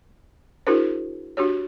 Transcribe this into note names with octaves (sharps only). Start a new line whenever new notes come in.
D4 E4 F#4 G#4 A#4 C5
D4 F#4 G4 C#5